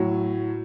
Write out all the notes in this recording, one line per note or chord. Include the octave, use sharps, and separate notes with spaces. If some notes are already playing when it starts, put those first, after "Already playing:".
Already playing: A2 F#3